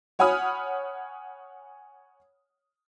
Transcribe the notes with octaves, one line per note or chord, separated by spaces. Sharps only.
C#5 F#5 G#5 B5 D#6 F6